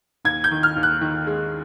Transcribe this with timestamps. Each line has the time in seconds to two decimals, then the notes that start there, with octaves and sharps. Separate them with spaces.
0.25 D#2 G#6
0.44 G6
0.51 D#3
0.63 F6
0.76 D#2
0.83 F#6
1.01 D#3
1.27 G#3